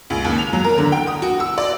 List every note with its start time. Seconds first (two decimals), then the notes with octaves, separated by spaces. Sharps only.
0.10 C#2
0.25 D#2
0.38 F7
0.53 F#3
0.64 A#4
0.78 D3
0.92 G5
1.07 D#6
1.22 F#4
1.40 E6
1.58 D5